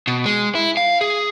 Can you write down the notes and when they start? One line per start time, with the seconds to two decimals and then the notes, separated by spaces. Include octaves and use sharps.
0.07 B2
0.26 G#3
0.55 E4
0.77 F5
1.01 G#4